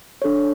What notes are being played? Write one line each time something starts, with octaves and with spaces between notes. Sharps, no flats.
D4 A4 C#5